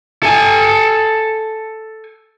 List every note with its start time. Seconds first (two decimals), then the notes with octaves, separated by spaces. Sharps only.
0.23 A4 G#5